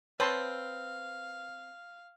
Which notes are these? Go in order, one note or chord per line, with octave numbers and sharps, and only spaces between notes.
C4 B4 C#5 F5 A5 C6